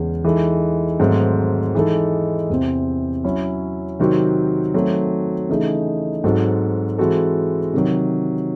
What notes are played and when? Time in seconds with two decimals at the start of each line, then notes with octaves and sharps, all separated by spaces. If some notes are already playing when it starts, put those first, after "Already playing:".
Already playing: E2 C#3 G#3 C#4
0.24 E3 G#3 D#4 A4
1.00 G#2 D#3 F#3 A3 C4
1.75 E3 G#3 D#4 A4
2.50 E2 C3 E3 C4
3.24 F#3 C#4 E4
3.99 C3 D#3 F#3 C4 F#4
4.74 D#3 F#3 A3 C4 F#4
5.49 C#3 E3 A3 D#4 G#4
6.24 G#2 F#3 C4 F#4 A4
6.98 E3 G#3 C4 F#4 A4
7.74 C3 D#3 F#3